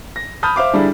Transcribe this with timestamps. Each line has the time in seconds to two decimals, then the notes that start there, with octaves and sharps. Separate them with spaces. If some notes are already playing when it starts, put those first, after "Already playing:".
0.16 A#6
0.43 A5 B5 D#6 F6 G6
0.56 C5 E5 F5 D6
0.73 D3 G3 D4 E4 G#4